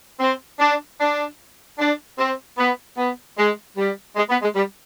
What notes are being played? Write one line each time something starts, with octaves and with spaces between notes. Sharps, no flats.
C4
D4
D4
D4
C4
B3
B3
G#3
G3
G#3
B3
G#3
G3